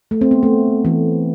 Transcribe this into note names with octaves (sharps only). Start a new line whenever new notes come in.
A3
C4
B3
A3
E3